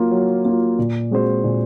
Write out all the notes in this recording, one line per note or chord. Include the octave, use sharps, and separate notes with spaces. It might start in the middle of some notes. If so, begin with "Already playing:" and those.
Already playing: F#3 A#3 F4
F#3
A#3 F4
A#2
G#3 C4 F#4 C5
A#2